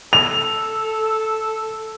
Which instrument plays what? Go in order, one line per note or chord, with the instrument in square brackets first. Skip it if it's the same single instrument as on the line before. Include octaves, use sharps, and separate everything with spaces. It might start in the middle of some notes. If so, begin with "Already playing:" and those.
[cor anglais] A4 [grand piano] F7